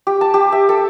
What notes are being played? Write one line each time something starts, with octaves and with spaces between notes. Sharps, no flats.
G4
A5
G4
E5
A4